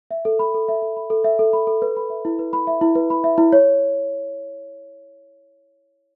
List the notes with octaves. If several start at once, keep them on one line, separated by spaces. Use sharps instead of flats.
E5
A4
B5
A4
E5
A4
B5
A4
E5
A4
B5
A4
B4
B5
E5
E4
B4
B5
E5
E4
B4
B5
E5
E4
C#5